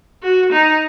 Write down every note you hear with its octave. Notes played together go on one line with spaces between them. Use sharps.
F#4
D#4